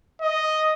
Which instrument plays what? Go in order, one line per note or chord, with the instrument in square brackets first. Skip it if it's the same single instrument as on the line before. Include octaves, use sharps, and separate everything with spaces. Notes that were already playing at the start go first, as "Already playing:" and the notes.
[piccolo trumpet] D#5